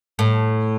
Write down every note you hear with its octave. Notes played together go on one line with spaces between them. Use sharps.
A2